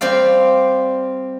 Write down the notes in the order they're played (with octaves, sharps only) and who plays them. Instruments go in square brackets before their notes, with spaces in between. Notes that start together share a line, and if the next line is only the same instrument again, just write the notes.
[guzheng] G3 C4 C5 D5 F5